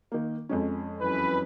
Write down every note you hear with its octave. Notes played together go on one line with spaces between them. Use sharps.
D#3 A#3
F2 G#3 C#4
F#2 E3 B4